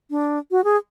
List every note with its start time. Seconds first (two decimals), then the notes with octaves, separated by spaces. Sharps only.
0.10 D4
0.51 F#4
0.64 G#4